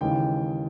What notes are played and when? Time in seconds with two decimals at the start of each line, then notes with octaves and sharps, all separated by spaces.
0.01 D#2 C#3 E3 G#3 G5